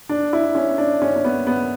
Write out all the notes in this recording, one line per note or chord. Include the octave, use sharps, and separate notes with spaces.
D4
E4
C#4
D4
C#4
C#4
B3
B3